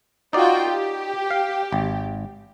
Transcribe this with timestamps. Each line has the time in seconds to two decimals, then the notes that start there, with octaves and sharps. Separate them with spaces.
0.33 D#4 F4 F#4 D5 G5
0.66 G4
1.31 F5
1.72 G#1